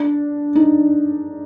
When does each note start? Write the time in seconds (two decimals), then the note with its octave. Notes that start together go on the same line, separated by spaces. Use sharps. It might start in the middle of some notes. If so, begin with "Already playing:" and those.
Already playing: D4
0.55 D#4